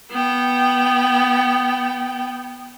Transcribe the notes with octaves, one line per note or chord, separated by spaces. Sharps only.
B3 G5